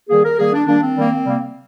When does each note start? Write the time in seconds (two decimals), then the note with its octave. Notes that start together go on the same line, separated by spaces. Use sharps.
0.09 D#3 G3 A#3 G#4
0.24 A#4
0.38 D#3 G3 A#3 G#4
0.53 D4
0.67 D#3 G3 A#3 D4
0.82 C4
0.97 D#3 G3 A#3
1.25 C3 G3 A#3